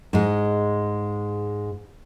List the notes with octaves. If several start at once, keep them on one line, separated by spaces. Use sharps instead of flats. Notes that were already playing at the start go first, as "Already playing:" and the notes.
G#2 G#3